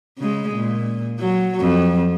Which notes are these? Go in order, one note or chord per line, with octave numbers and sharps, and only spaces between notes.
C#3 G#3
A#2
F#3
F2